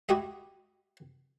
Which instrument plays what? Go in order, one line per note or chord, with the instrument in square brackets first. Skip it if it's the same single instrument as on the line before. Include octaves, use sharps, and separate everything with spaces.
[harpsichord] E4 F#4 G4 D#5 E5